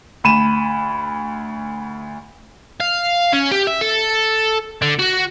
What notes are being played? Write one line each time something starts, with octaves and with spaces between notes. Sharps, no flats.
D2 B5 D#7 E7
F5
C#4
G4
E5
A4
D3
F#4